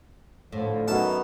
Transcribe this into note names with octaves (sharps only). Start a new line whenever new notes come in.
A2 D3 F3
F#2 B3 D#4 A5